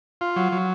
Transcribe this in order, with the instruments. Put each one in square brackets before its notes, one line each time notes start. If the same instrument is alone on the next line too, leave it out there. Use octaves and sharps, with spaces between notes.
[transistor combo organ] F4
F#3
F#3